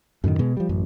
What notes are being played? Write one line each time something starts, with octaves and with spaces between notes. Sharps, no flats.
F#2 A2 D3 D#3
B2 G#3
F3 G3
A1 F#2